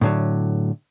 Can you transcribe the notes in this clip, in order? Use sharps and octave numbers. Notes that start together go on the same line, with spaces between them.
A2 D3 F#3